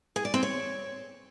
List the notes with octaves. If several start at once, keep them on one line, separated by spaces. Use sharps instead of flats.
G#4
D5
C4
C#5